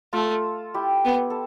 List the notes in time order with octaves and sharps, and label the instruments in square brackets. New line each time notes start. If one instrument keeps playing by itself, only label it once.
[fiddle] A3 [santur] F4 A4
[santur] E4 G4
[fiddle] B3
[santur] A4